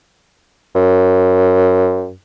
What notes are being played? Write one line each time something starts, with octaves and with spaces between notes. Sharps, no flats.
F#2